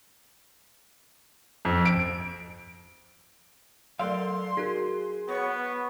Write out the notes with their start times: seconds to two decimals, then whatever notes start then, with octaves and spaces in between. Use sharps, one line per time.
1.65 F2
1.85 D7
3.99 F#3 A3 A4 A#4 D5 F5 C6
4.57 D#4 F#4 G#4 A#4
5.29 B3 C#5 C#6